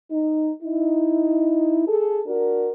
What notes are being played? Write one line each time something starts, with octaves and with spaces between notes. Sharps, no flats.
D#4
D#4 E4
G#4 A4
D4 F#4 A#4